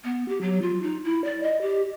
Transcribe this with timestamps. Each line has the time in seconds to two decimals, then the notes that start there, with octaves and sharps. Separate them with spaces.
0.04 B3
0.28 G4
0.41 F#3
0.62 F4
0.82 D#4
1.04 E4
1.24 D5
1.43 D#5
1.61 G4